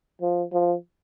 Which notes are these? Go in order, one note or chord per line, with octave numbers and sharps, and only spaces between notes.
F3
F3